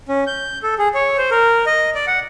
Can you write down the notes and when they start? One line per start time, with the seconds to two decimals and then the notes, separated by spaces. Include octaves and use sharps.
0.08 C#4
0.27 G6
0.63 A4
0.78 G#4
0.94 C#5
1.18 C5
1.31 A#4
1.66 D#5
1.95 D5
2.07 F#5